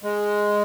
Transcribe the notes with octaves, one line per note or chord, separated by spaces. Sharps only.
G#3